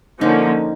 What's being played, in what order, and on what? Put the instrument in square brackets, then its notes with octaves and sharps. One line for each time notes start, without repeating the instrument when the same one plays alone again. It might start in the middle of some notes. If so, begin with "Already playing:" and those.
[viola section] D3 F3 A#3 C#4 [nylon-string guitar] D#4